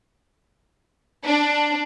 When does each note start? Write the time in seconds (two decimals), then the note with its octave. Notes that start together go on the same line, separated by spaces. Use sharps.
1.25 D4